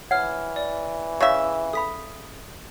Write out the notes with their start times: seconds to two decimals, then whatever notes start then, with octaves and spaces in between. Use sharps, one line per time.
0.11 E3 C#5 F#5 F6
0.56 D5
1.20 C#3 E5 F5 C#6
1.73 A4 B5 D#6 B6